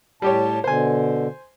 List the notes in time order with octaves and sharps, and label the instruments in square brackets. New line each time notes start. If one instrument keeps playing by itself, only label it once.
[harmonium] A2 A5 [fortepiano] G3 G4 C#5
[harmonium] B2 D3 [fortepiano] C5 G#5